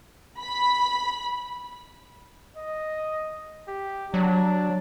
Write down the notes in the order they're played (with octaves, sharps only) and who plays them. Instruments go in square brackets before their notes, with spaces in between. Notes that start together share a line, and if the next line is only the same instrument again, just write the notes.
[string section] B5
[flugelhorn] D#5
G4
[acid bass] F#3 [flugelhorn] D4